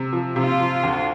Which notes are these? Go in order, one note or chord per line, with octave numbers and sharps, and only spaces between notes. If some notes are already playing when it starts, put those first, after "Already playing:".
Already playing: C3
F3
C3 F4
F3
D2